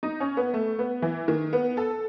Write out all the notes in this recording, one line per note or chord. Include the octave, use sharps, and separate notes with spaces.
D#4
C#4
B3
A3
B3
E3
D#3
B3
A4